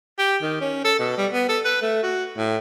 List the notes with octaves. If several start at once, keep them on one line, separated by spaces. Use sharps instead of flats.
G4
D#3
C#4
A4
B2
G3
B3
A4
B4
A3
F#4
A2